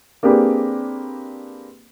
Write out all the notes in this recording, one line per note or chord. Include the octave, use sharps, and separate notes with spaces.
A#3 C4 D4 G4 G#4 B4